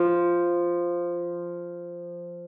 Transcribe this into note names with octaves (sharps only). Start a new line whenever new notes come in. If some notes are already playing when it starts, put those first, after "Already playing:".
Already playing: F3